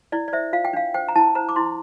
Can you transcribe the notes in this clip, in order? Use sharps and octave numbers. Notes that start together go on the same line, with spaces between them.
E4 D5
D5
C5 E5
F4 F5
G5
D4 F5
C5 G5
A#5
E4 A5
C5 A#5
D6
E4 C6